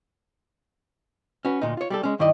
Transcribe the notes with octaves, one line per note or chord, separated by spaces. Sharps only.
C#4 F#4 B4
D2 A#2 D#4
F4 C#5
G3 G4 A4
G#3 C#4
G2 D#3 E4 D5 D#5